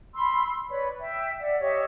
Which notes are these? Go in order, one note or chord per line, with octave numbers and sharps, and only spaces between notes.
B5 C6 E6
B4 C#5 D5 B5
E5 G5
D5 E5 F#5
G4 C#5 D#5 E5